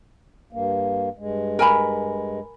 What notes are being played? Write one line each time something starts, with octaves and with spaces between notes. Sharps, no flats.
G2 A#3
G2 G#3
A#4 G#5 B5